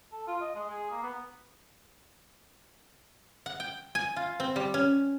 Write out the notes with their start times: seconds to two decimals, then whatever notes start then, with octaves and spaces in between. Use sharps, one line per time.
0.12 A4
0.27 F4
0.41 D#5
0.55 G#3
0.70 G#4
0.91 A#3
1.03 B3
3.46 F#5
3.60 G5
3.95 G#5
4.16 F4
4.40 C4
4.56 G3
4.74 C#4